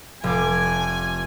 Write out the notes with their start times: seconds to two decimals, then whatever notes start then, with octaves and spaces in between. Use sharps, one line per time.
0.24 F1 G#5 D6